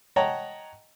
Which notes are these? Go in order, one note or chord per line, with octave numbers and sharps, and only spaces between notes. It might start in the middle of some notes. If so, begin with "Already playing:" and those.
C#5 D#5 F#5 G5 A5 A#5